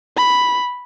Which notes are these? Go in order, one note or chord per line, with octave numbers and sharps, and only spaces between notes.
B5